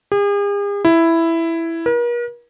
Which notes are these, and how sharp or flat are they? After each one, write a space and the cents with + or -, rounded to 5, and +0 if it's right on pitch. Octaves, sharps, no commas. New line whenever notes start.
G#4 -45
E4 +5
A#4 +45